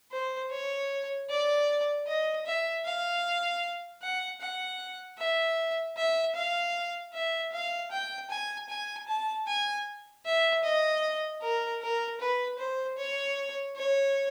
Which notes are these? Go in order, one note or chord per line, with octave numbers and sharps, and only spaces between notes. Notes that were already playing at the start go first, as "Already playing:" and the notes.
C5
C#5
D5
D#5
E5
F5
F#5
F#5
E5
E5
F5
E5
F5
G5
G#5
G#5
A5
G#5
E5
D#5
A#4
A#4
B4
C5
C#5
C#5